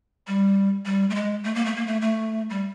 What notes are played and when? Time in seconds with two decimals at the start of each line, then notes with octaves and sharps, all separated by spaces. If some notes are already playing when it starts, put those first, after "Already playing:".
0.28 G3
0.86 G3
1.10 A3
1.15 G#3
1.44 A3
1.55 A#3
1.66 A3
1.76 A#3
1.87 A3
2.02 A3
2.50 G3